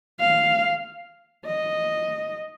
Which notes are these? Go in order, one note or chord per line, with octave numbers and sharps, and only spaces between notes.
F5
D#5